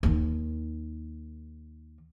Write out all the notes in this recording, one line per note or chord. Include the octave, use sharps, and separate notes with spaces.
D#2 D#3